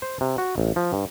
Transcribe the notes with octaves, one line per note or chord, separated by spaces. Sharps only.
C5
C3
F#4
A1
F3
G2